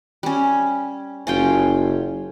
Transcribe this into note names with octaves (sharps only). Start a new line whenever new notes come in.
G3 C#4
F#1 C#4 F4 G5